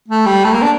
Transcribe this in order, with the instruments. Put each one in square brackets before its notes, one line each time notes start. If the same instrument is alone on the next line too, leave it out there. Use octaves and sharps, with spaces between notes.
[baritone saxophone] A3
G3
A3
A#3
D4